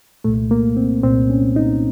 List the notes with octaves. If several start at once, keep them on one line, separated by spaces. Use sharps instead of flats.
C2 A#2 A3
A#3
C4
C2 A#2 C4
C#4
D#4